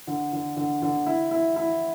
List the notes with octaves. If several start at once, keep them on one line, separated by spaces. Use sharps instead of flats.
D3
D3
D3
D3
E4
E4
E4